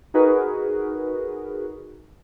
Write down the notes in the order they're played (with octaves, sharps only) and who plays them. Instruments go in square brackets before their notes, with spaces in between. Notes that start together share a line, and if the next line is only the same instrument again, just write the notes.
[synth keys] D#4 F#4 G#4 A#4 B4